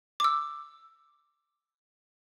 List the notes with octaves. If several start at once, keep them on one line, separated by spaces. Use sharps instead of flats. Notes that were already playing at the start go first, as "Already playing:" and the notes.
D6 E6